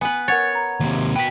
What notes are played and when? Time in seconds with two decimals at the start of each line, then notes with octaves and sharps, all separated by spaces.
0.01 B3 B4 G#5
0.28 A#4 C#5 F#5 A6
0.55 A#5
0.80 D#2 C3
1.16 F#4 B4 G5 B6